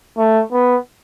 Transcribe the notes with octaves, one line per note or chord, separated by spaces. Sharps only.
A3
B3